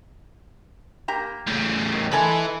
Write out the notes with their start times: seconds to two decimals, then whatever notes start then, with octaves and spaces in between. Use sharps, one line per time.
1.08 A#3 G4 A#5
1.47 A2 C#3
1.92 D#3
2.12 G#3 E4 A4 B4 G#5